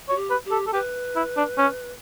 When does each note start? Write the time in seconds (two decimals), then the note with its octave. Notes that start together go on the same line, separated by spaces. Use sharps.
0.09 F#4 C#5
0.16 G4
0.31 B4
0.45 G4
0.51 A4
0.67 A4
0.73 G4 B4
1.16 E4
1.37 D4
1.58 C#4